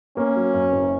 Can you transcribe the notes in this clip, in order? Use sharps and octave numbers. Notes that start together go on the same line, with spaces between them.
A#3 C#4
F#3
F#2
F#1